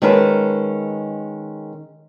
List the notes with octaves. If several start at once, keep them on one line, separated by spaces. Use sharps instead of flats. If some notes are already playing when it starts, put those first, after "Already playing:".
D#3 G#3 C#4 A#4 B4 A5